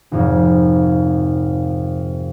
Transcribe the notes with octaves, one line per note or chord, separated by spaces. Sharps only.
G#1 F2 C3